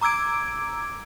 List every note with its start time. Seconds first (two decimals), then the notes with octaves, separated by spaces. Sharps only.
0.01 A#5 D6 E6 G#6 D7